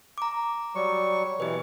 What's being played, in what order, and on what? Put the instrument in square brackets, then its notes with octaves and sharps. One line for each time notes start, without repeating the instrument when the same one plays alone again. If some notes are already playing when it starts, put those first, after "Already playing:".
[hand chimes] A#5 D6
[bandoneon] F#3 G3 C#6
[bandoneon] B2 E3 [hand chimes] G4 B4